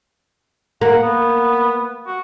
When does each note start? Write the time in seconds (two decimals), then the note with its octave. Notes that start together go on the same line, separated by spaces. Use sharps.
0.81 A#3 F#5
1.03 B3
2.07 F#4